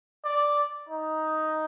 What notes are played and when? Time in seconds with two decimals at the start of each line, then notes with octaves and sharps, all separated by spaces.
0.24 D5
0.89 D#4